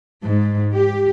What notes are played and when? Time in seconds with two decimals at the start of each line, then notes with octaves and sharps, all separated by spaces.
0.24 G#2
0.73 G4